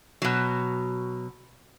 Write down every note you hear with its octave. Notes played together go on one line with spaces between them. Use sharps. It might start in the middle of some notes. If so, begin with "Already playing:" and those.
B2 F#3